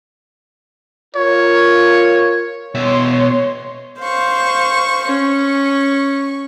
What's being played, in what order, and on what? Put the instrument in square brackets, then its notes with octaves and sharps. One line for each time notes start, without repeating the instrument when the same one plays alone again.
[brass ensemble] F4 A#4 [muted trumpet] C#5
[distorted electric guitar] B2 E5 [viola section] C#5 C6
[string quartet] C5 F5 C#6
[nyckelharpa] C#4 [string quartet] C#6